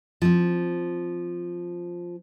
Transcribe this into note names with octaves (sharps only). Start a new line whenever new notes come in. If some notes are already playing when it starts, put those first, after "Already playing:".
F3 C4